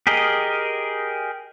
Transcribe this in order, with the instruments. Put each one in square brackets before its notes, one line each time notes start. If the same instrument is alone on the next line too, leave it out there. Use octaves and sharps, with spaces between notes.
[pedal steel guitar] G4 G#4 A#4 D#5